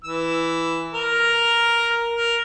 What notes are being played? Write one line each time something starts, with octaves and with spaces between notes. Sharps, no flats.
E3 E6
A#4 A#5
A#4